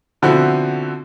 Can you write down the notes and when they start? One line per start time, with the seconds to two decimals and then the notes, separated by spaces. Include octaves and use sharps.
0.22 B2 D3 F3 C4 E4 F#4